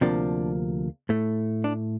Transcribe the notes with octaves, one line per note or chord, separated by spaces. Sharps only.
D2 C3 F3 A#3 D4
A2 A3
D4